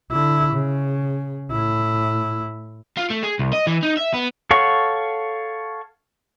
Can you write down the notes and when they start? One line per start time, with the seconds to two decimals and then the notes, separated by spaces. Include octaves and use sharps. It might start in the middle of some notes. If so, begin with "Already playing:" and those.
0.11 D3 E4
0.53 C#3
1.51 A2 E4
2.98 F4
3.10 A3
3.23 G#4
3.39 C2
3.53 D#5
3.67 E3
3.83 D#4
3.97 E5
4.14 B3
4.51 A4 C#5 F5 F#5 C#6